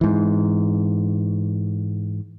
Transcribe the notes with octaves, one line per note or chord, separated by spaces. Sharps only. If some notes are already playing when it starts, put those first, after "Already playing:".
G#2 E3